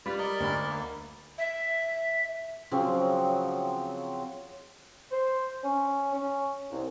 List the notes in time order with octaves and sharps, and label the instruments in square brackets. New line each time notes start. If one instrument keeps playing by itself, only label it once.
[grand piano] G3 [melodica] F4 B4 D5
[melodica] A#4 D5 D#5
[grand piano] D2 B5
[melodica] A#3
[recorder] E5
[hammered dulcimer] C#3 F3 F#3 C4
[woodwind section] C5
C#4
C#4
C2